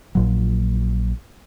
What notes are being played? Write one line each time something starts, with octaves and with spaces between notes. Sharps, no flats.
A#1 A#2 F#3